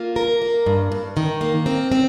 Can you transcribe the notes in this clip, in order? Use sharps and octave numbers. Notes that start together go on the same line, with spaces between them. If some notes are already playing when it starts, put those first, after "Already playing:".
Already playing: A#3 F4
A#4
A#3
G2
G2
D#3
A#3
C4
C4